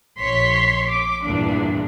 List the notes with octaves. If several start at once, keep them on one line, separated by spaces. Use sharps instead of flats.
A#1 C#5 C6 B6
D6
E2 G2 A#2 D4